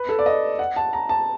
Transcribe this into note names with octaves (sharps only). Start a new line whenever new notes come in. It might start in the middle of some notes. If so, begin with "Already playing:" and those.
Already playing: B4
A4
D5
D#5
F#5
A5
A#5
A5